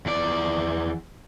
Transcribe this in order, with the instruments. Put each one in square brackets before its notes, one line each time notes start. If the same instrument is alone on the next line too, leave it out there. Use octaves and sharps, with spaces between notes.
[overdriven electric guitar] E2 D5